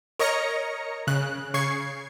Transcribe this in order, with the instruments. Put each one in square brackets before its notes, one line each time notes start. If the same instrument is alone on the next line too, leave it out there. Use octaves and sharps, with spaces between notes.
[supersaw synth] A#4 C#5 D#5 A#5 A#6 C#7
C#3 F#6
C#3 C#6 G#6 C7